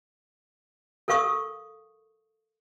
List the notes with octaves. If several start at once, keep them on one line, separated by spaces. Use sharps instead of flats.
A4 A#4 F5 C#6 D#6